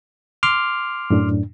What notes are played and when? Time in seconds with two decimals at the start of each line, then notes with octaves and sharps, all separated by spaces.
0.43 C6 D6 F6
1.10 F#2 A2 D4